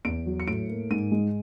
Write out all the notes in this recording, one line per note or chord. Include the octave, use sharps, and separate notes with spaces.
E2 D7
F#3
C#7
A2 D7
A#3
G#2 D#7
G#3